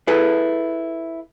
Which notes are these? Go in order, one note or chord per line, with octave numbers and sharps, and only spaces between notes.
E4 G#4 A4 B4